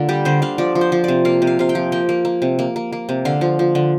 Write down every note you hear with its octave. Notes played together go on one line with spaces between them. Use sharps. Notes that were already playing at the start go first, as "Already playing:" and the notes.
Already playing: D3 A#3 F4
G3 G4
D3 C5
D3 F5
F3 D5
F3
C5
F3
C3 D5
A#3 F5
C3
F5
C3 F5
G5
F3
A#3 G5
A#3
A#3
C3
A#3
A#3
A#3
C3
D3 F5
F3
F3
D3